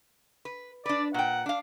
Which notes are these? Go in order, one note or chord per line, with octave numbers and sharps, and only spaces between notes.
B4
D4 B4 D5
A#2 F#5 G5
D4 F5